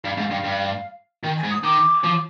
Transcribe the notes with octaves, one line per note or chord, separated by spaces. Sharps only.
G2 F5
G#2
G2
G2
D#3 G5
G#5
G#2
D#6
D#3 D6
F3